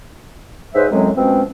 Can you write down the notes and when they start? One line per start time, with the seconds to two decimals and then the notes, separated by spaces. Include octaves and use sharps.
0.74 G#2 F#3 B4 C5 E5
0.92 F#2 A2 F#3 G#3 C4
1.16 B2 F3 G#3 C4 C#4